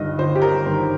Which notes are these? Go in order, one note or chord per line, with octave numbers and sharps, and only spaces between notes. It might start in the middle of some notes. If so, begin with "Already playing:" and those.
Already playing: G1 G2 D#3 D#5
G1 C5
G4
A#4
G2 D#3 C5